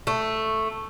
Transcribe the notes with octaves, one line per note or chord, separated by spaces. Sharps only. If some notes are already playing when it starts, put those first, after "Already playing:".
A3